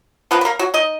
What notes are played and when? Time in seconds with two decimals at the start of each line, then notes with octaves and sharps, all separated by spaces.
0.31 F3 A#3 B3 B4
0.41 B4
0.45 A#3 A#4
0.59 F#3 F#4
0.74 D#4 D#5